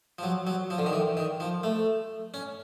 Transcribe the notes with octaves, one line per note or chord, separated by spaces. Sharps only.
F3
F#3
F#3
F3
D3
D#3
E3
D#3
F3
A3
C#4